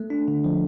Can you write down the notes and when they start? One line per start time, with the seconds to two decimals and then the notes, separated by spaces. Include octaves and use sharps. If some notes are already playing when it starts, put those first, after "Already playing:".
Already playing: A3 A4
0.10 D4
0.28 D3
0.44 F3